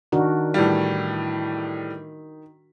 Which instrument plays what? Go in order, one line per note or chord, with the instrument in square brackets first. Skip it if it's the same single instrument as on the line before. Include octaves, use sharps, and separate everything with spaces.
[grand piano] D#3 [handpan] D4 F#4 A#4
[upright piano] A2 E3 G3